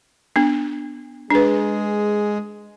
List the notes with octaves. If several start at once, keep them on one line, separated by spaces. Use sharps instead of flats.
B3 D4
G#3 D4 G#4 B4